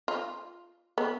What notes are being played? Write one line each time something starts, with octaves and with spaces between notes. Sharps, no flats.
F4
B3